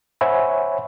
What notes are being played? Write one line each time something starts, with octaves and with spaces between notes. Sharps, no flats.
C5 C#5 E5 F#5 G#5 B5